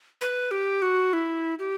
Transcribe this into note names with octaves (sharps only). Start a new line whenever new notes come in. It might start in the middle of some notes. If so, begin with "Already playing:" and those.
B4
G4
F#4
E4
G4